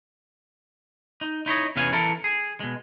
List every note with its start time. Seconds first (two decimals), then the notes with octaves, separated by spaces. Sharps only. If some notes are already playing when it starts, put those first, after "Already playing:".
1.21 D#4
1.46 D#4 E4 C#5 D#5
1.76 E2 C3 B3 C#4 F5 G#5
1.92 E3 E4 A4 A#4
2.24 G#4
2.60 B2 G#3